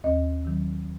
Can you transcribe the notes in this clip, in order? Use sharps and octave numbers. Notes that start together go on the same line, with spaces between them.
D#2 D#5
D#3 F#3